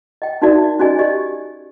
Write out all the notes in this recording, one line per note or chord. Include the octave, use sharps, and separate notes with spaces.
D#5 G5
D4 D#4 F#4 A#4 D5 E5
C#4 F#4 G#4 D5 D#5 G#5
G4 D5 D#5